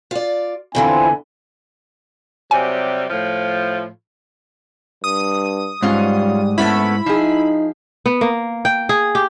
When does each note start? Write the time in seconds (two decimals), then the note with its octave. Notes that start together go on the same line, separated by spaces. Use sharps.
0.11 F4 D5
0.75 E2 D3 E3 C4 E4 F4 G#5
2.51 C3 F#3 G3 G#5
3.10 A2 F3
5.04 G2 D#6
5.82 G#2 F#3 G3 C#4 F4
6.58 A3 B3 C#4 E4 B5
7.06 F3 D#4 G#4
8.06 B3
8.21 A#3
8.65 G5
8.89 G#4
9.15 G4